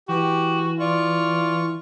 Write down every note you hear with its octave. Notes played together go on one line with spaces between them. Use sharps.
E3 F#4 G4
F4 D5 C#6